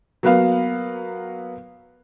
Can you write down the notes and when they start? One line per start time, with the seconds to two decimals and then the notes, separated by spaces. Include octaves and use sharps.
0.23 F#3 A#3 B3 B4 F5